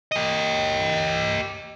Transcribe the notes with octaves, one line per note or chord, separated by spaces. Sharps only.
G4 D#5